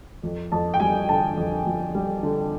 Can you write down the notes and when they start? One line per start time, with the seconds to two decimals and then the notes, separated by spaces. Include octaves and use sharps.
0.23 F2
0.52 F2 A5
0.74 G5
0.80 G3 G#5
1.09 D3 A5
1.37 F2
1.67 F2
1.95 G3
2.23 D3